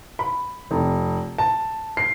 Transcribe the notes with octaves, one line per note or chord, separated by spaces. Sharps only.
B5
F1
A5
C7